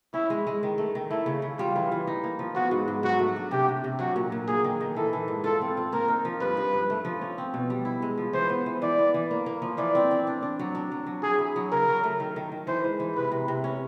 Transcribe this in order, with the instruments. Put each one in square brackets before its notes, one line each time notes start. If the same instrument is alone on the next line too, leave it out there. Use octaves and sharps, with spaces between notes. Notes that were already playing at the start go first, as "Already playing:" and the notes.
[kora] C#4 [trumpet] E4
[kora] G#3
G#3
D#3
A3
D#3
[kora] A3 [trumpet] E4
[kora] C#3
C#3
[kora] G3 [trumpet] F4
[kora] E3
E3
D#4
A#3
F3
[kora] B3 [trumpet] F#4
[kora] G#2
G#2
[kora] F#3 [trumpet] F#4
[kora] A3
D4
[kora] C3 [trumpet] G4
[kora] C3
C3
[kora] F#3 [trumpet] F#4
[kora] A#2
A#2
[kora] A#3 [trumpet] G#4
[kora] D#3
D#3
[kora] E3 [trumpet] A4
[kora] E3
G#2
[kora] F4 [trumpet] A4
[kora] C4
F4
[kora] A#3 [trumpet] A#4
[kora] D#4
F3
[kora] G2 [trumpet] B4
[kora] G2
G2
A3
F3
C#4
C4
B2
G3
E4
G#3
F3
[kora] E3 [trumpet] C5
[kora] B3
E3
[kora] E3 [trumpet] D5
[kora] B3
E3
A#3
A#3
F3
[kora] E3 [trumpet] D5
[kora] C4
C4
D4
D4
F#3
D4
F#3
F#3
[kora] F#3 [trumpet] G#4
[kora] E4
F#3
[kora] C#3 [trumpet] A#4
[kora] F#3
A3
D#3
D#3
D#3
[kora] E3 [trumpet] C5
[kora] G#3
E3
[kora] C3 [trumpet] B4
[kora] C3
C3
C#4